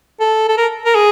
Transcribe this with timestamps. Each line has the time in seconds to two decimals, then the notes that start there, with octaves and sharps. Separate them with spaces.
0.20 A4
0.48 A4
0.58 A#4
0.85 A#4
0.95 G#4